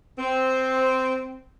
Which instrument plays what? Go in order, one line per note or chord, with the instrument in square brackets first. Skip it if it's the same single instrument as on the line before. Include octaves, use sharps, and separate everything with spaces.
[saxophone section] C4